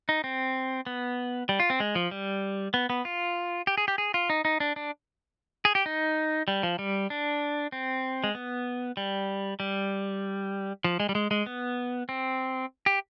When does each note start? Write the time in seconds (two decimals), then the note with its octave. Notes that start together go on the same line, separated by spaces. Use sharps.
0.09 D#4
0.24 C4
0.86 B3
1.49 G3
1.60 F4
1.70 C4
1.80 G#3
1.95 F3
2.11 G3
2.74 B3
2.90 B3
3.05 F4
3.67 G4
3.78 G#4
3.88 G4
3.98 G#4
4.14 F4
4.30 D#4
4.45 D#4
4.60 D4
4.76 D4
5.65 G#4
5.75 G4
5.86 D#4
6.48 G3
6.63 F3
6.79 G3
7.10 D4
7.72 C4
8.24 G#3
8.35 B3
8.97 G3
9.60 G3
10.84 F3
11.00 G#3
11.09 G3
11.15 G#3
11.31 G#3
11.46 B3
12.09 C4
12.86 G4